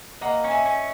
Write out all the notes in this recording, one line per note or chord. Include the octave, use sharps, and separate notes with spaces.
A#3 D#5 F#5
C#4
E5 G#5
C#4